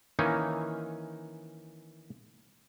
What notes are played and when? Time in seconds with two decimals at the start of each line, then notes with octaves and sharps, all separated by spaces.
0.19 D#3 E3 A#3 C#4 D#4